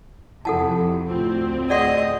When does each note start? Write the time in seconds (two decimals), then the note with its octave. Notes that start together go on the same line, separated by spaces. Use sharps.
0.45 F2 C3 E4 A4 F#5 A5
1.10 D2 A2 C4 F4
1.70 G#4 D5 D#5 F#5 C6